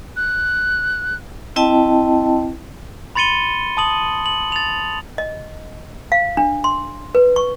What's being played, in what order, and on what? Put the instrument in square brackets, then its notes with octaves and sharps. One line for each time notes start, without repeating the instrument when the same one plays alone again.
[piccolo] F#6
[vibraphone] C4 E4 D#5 G5 A5
[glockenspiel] B5 C6 A6 C#7 D#7 G7
A5 D#6 F#7
F#7
A6 F7
[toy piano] D#5
F5
D4
C6
B4
C#6